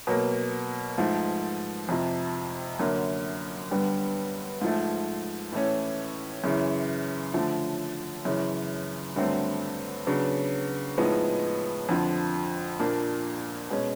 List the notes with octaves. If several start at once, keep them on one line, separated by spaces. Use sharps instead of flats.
B2 F#3 A#3
G#2 F3 A3
F2 C3 F3
F#2 D3 F#3 A#3
G2 D3 G3 B3
G#2 F3 A3
A2 E3 A3 C#4
F#2 C#3 E3
D3 F3 A3
F#2 C#3 E3
G2 D3 F#3 A3 C4
C#3 F#3 B3 D4
A2 F3 G#3 B3 D#4
F2 D3 F3
A#2 F3 A#3 D4
B2 G#3 C#4